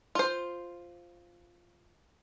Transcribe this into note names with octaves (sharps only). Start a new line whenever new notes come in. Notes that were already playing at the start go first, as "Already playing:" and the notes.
F4 C5